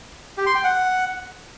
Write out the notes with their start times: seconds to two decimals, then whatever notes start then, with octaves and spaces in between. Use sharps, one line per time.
0.37 G4
0.46 C6
0.55 G5
0.64 F#5